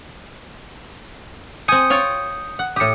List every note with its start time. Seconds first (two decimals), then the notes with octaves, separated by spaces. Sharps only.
1.68 C4 G#5 D#6 G6 C#7
1.90 F4 C#5 G5
2.59 F#5
2.76 A2 G4 D#6 C#7